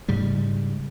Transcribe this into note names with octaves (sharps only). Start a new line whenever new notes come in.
G#2 C#3 G3